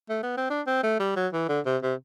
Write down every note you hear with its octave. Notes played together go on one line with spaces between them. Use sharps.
A3
B3
C4
D4
C4
A3
G3
F#3
E3
D3
C3
C3